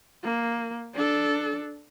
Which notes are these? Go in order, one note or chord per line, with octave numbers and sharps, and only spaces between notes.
A#3
D4 A4